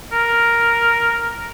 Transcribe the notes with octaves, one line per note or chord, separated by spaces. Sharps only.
A#4